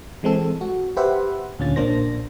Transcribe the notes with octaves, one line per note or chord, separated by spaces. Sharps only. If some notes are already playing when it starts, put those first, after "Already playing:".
E3 G#3 C4 A4
F#4
G4 B4 C5 E5 F#5
D2 A#2 D3 C#4 F4 A6
A#1 A#2 A#3 D4 C5 A#6